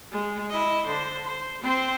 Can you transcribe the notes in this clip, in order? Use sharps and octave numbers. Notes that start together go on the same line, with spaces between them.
G#3
E4 D#5
D3 C5
C5
C4 C5